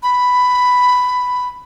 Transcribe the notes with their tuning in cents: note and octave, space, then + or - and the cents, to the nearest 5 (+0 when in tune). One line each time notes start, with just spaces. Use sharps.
B5 +10